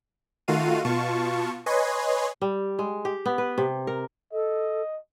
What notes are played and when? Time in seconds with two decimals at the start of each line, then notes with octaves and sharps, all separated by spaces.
0.48 D#3 A3 F4 F#4 F5 D#7
0.85 B2 F4 A5 C#6
1.66 B4 C#5 D#5 G#5 C6
2.41 G3
2.79 G#3
3.05 G4
3.26 B3
3.38 B4
3.58 C3
3.87 A#4
4.33 A4 D#5